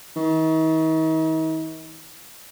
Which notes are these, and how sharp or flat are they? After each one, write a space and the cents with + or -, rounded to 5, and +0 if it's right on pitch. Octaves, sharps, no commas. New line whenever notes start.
D#3 +45